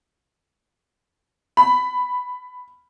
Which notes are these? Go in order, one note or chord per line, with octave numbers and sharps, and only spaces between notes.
B5